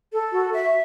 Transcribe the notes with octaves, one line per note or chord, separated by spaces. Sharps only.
A4
F#4
E5